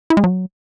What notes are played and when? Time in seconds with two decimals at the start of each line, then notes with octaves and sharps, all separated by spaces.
0.10 E4
0.17 G#3
0.24 F#3